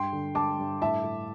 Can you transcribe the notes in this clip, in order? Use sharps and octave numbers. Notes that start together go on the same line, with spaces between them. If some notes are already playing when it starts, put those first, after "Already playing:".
Already playing: G2 G5 C6
D3
G2 A5 D6
G2
A2 E5 A5
A2